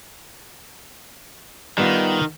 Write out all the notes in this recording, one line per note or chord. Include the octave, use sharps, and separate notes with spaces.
D#3 G3 B3 F4